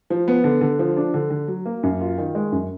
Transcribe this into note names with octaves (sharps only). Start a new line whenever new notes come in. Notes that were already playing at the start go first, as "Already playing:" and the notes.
F3
B3
D3
D3
F3
D4
D3
D3
F#3
A#3
F#2
F4
D#3
G#3
F#2